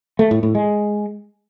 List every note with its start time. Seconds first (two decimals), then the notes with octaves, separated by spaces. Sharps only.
0.19 A3
0.31 A2
0.43 A2
0.55 G#3